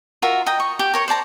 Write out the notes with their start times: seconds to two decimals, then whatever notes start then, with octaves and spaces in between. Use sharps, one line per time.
0.22 F4 F#4 A#4 E5
0.46 D#5 G5 A#5
0.60 C#6
0.79 G4
0.94 A#4 C#5 C#6
1.08 C5 D5 A5 A#5